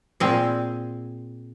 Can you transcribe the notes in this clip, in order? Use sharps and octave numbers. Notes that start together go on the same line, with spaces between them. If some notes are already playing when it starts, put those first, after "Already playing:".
A#2 C4 G#4